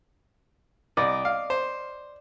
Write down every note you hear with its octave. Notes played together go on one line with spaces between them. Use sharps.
C2 D5 D#5
F5
C5